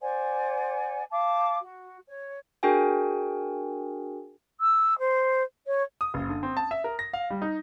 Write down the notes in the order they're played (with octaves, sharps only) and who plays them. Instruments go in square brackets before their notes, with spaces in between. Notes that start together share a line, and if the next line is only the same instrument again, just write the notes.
[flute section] C5 D5 F#5 G#5
F5 A5 D6
F#4
C#5
[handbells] D4 F#4 G#4 A#4 G5 G#5
[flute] E6
C5
C#5
[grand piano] D#6
F#1
D3
C4
A5
E5
A#4
A#6
F5
G3
D#4